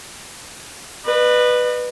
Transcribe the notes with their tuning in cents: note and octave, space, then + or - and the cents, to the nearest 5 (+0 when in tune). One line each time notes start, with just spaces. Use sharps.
B4 +0 D#5 -45